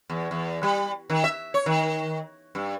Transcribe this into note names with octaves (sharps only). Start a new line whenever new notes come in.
E2
E2
G3
D#3
E5
C#5
D#3
G2